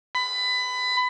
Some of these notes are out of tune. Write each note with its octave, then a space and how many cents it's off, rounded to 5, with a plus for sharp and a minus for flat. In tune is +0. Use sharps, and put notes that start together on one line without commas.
B5 +20